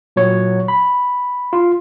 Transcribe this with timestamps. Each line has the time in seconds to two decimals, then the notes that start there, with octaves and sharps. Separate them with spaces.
0.16 A#2 F#3 C#5
0.68 B5
1.53 F4